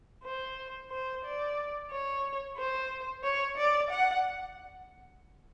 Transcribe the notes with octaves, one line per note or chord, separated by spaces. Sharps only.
C5
C5
D5
C#5
C5
C#5
D5
F#5